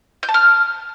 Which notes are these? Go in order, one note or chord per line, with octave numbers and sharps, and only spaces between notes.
G6
A5
F6